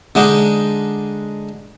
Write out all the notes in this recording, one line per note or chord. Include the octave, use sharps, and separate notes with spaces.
D3 G#3 D4 D#4